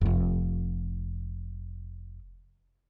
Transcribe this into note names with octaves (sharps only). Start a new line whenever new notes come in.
F1 F2